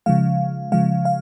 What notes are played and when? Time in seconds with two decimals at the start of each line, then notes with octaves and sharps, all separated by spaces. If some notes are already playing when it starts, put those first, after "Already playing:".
0.06 C#3 F3 G#3 F5
0.72 C#3 F3 G#3 F5
1.05 F5